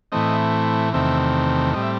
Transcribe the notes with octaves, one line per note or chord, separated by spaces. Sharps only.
A2 E3 A3 C4 D#5
E2 C3 D#3 A3 C4 E5
A2 G3 C4 D#5
E5